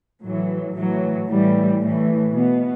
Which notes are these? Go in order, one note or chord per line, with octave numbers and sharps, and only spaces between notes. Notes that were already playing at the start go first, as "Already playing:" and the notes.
A2 E3 F#3
A2 E3 F#3
A2 E3 G3
A2 E3 A3
B2 B3